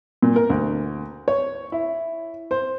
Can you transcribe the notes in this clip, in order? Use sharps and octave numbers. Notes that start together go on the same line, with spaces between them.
A#2
A#4
D2
C#5
E4
C5